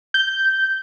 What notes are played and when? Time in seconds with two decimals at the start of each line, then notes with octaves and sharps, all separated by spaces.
0.14 G6